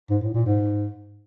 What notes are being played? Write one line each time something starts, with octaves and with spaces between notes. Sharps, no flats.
G#2
A2
A#2
G#2